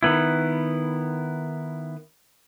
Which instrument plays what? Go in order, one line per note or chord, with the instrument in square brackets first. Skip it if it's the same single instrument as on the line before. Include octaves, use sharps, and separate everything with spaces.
[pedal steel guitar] D#3 B3 E4